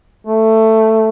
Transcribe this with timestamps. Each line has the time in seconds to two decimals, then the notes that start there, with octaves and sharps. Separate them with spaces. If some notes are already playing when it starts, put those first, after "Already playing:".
0.27 A3